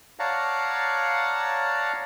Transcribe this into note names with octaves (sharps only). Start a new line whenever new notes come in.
C#5 D5 F5 F#5 A5 A#5